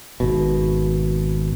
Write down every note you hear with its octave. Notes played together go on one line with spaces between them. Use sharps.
G#1 B2